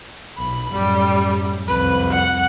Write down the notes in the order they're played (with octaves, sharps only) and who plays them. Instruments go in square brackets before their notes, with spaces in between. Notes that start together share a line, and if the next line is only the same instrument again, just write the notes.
[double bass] B1 [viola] B5
[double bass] F#2 A2 [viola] G3 G4
[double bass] C2 F2 [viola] B4
[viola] F#5